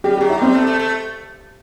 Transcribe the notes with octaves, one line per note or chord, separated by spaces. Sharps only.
G3 G4
F#3 G4
E4
G3 C4
A3
A3
A3